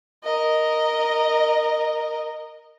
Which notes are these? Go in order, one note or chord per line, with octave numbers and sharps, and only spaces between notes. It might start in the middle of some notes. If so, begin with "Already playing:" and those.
A#4 D#5